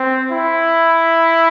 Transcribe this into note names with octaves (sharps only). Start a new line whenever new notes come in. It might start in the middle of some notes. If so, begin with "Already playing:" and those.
Already playing: C4
E4